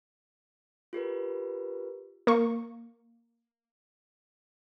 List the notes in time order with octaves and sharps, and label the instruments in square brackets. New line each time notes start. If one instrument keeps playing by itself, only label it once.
[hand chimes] F4 G4 A#4 B4
[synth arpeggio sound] A#3 C#6